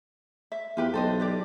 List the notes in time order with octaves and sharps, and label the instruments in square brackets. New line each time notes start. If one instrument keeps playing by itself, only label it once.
[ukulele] E5
[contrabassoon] E2 [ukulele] F4 G4 B4
[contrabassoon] B1 [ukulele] A4 C5 D#5
[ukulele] D4 G4 D5